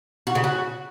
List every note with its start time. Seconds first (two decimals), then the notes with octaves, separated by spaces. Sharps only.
0.27 F#4
0.35 C#3
0.44 F#4